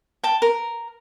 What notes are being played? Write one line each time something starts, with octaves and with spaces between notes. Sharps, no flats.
G5 A5
A#4